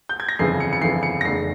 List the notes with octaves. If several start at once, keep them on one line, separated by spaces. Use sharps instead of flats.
G6
G#6
A#6
G1 F2 C#3 E3 C7
C#7
C#7
G1 F2 C#3 E3 C7
C#7
A#6
F1 E2 C#3 C7